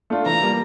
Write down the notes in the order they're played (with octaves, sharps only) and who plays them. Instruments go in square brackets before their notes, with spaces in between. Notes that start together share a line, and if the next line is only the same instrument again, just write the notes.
[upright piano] A3 D4 F4
[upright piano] E3 [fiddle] A#5
[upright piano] G3 A#3